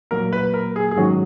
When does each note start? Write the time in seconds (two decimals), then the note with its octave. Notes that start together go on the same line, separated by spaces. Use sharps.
0.11 A#2 F#3 A#3 A#4
0.33 B4
0.54 A#4
0.76 G#4
0.91 G#4
0.97 G#2 D#3 F#3 C#4 F#4